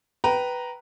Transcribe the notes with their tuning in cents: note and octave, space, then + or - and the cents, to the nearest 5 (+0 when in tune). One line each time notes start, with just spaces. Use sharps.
B4 +0 G5 -20 A#5 +0